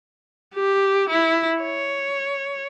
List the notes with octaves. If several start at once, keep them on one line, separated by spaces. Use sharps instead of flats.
G4
E4
C#5